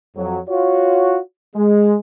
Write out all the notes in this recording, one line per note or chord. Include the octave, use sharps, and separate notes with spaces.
F2 F#3
F4 F#4 C#5
G#3